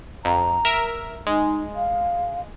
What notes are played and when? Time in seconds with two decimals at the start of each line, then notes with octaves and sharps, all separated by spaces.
0.25 F2 A#5
0.65 A#4 E5
1.27 G#3 D#4
1.76 F5